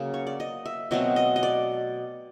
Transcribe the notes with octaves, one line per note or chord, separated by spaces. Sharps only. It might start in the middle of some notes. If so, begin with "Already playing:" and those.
Already playing: C#3 F#3 A#3
C#5
D5
D#5
E5
B2 F#3 A3 C4 D#5
D#5
D#5
D5